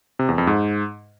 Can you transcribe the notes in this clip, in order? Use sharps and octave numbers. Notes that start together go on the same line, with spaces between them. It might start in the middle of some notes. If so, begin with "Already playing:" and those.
C3
E2
F2
G#2